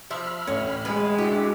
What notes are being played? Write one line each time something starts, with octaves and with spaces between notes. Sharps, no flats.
F3 E5 B5 F6
A1 D2 C#4
G#3 B4
D4 E4 F#4 G4